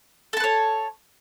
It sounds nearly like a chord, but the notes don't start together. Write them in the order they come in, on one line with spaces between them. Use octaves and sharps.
A4 A5 B4 C#5